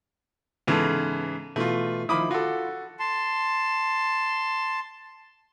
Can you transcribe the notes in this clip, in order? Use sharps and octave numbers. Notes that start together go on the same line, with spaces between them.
G#2 C#3 E3 B3 A4
B2 E3 A3 F4
D#3 F3 E4 B5 D6 D#6
F4 F#4 A4
A5 C6